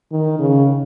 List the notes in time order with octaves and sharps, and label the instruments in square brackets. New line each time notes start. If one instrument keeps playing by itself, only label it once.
[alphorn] D#3
C#3